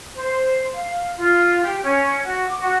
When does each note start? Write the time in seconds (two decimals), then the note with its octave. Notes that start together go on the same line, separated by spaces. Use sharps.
0.15 C5
0.73 F5
1.17 F4
1.63 G4
1.83 C#4
2.23 F#4
2.47 D6
2.60 F#4